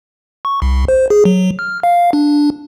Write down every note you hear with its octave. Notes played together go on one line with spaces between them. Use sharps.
C#6
C2
C5
G#4
F#3
F6
F5
D4